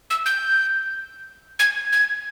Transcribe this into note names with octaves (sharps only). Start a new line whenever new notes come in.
E6
G6
G#6
G#6